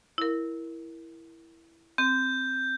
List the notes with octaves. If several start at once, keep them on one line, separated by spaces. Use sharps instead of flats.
E4 A#4
C4 G6